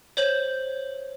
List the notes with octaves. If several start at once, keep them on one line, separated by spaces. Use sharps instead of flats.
C5 C#5 G6 F#7